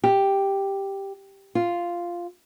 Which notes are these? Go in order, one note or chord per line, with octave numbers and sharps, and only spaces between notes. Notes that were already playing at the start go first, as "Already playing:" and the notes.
G4
F4